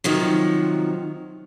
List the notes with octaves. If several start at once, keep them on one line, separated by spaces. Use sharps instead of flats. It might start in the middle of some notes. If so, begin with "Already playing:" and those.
C3 D#3 F3 F#3